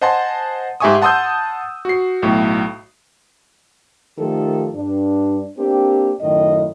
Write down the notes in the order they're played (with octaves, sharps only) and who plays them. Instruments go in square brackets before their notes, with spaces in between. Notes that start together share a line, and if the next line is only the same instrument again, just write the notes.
[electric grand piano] C5 D#5 F#5 G#5 A5 C6
G#2 G4 E5 G#5 C#6 D#6
F#5 A5 C6 D#6 E6 G6
F#4 C7
B1 A2
[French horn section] D#3 F3 A3 G4 A4
G2 D4
A#3 C4 D4 G4
F#2 A2 D#3 D#5